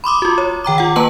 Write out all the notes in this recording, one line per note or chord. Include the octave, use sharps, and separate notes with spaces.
B5 C6 D6 D#6
F4 F#4
C#5
D#3 G5 A#5 D6
F4 F#5
A#3 B4 A5 A#5 F#7